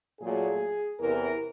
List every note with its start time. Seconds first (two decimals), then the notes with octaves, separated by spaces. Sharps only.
0.20 A#2 F#3 A3 G#4
0.99 E2 C3 E3 A#4